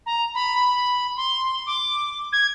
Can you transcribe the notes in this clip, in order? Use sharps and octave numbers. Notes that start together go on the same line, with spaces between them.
A#5
B5
C6
D6
G#6